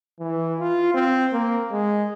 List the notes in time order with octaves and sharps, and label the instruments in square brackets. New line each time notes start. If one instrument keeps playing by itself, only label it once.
[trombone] E3
F4
C4
A#3
G#3